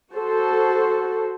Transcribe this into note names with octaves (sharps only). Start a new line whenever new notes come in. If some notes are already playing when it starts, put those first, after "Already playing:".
F#4 A4 C5